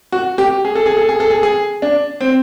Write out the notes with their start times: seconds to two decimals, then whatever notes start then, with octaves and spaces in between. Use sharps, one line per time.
0.12 F#4
0.38 G4
0.65 G#4
0.75 A4
0.86 G#4
0.97 A4
1.09 G#4
1.20 A4
1.30 G#4
1.43 G#4
1.82 D4
2.21 C4